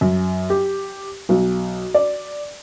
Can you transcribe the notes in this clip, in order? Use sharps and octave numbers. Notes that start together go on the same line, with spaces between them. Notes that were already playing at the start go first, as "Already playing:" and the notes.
F#2
G4
B1
D5